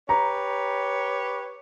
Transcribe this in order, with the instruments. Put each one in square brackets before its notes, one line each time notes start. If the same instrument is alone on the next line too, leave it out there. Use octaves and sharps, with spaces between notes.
[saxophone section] G4 B4 C#5 [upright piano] A#5